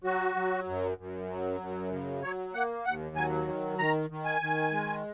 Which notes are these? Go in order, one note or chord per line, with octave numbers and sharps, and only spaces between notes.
F#3 F#4
F#3
F#2
F#2
F#3
F#2
C#3
F#3 C#5
A#3 F#5
D#2 F#5
F#3 G#5
D#3
D#3 A#5
D#3
G#5
D#3
G#3